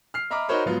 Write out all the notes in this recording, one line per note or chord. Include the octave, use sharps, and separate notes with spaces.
F6 C7
D#5 E5 A#5 B5 D6 F6
D#4 F#4 A#4 C5 C#5 B5
G#2 F#3 B3 F4